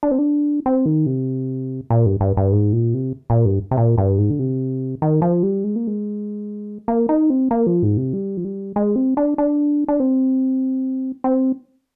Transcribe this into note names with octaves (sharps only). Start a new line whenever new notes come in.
D4
C4
D4
C4
D#3
C3
A#2
G2
G2
G2
G#2
A#2
C3
A#2
G2
C3
A#2
G2
G#2
D3
C3
D#3
F3
G3
G#3
A#3
G#3
A#3
D#4
C4
A#3
F3
G#2
C3
G3
F3
G3
G#3
C4
D4
D4
D4
C4
C4